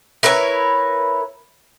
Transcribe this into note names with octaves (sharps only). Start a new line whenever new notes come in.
E4 A#4 B4 C#5